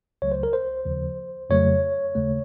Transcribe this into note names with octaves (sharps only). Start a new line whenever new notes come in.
C#2 C#3 F#3 A3 C#5
C5
A#4
C5
D#2 C#3 F3
F2 C#3 F#3 A3 C#5
D#2 C#3 A3